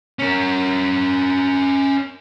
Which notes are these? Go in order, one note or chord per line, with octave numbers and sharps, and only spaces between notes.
C#4 A#4